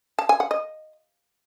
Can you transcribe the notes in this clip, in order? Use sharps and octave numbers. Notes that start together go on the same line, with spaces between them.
A5
G#5
F#5
D#5